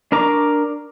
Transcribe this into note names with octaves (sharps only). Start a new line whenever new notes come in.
D4 A#4 A#5 C#6 D6